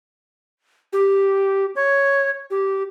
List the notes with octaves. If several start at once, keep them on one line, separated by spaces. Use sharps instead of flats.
G4
C#5
G4